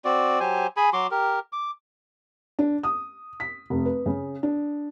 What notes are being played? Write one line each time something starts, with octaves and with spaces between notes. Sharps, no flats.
C4 F#4 D5
F#3 G4 C5 G#5
G#4 G#5 B5
F#3 F#4 C6 D6
G4 A#4
D6
D4
D#6
B6
F1
B4
C#3
D4